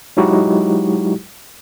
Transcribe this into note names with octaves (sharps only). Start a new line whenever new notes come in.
F#3 G#3 D#4 E4 F#4 G4